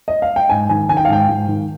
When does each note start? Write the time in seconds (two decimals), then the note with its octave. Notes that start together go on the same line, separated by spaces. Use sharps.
0.08 D#5
0.22 F5
0.36 G5
0.50 G#2 G#5
0.69 D#3 G#5
0.89 D#3 G#5
0.97 G5
1.05 F5
1.09 G#2 G5
1.29 G#2
1.48 D#3